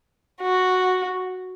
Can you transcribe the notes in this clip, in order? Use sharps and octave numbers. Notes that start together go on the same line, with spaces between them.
F#4